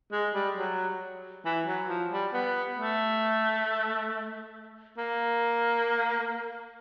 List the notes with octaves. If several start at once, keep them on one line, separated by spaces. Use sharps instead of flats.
G#3
G3
F#3
E3
F#3
F3
G3
B3
A3
A#3